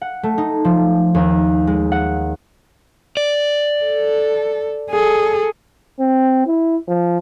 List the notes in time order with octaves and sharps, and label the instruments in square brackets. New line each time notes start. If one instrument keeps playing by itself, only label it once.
[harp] F#5
A3
D#4
F3
D#2
G#3
F#5
[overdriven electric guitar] D5
[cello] A4
G#4 A4
[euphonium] C4
E4
F3